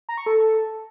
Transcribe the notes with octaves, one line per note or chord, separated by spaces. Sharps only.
A#5
C#6
A4